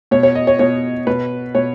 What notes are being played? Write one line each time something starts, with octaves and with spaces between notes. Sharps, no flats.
B2 C#5
C#5
D#5
C#5
B2 C#5
B2 B4
B2 C#5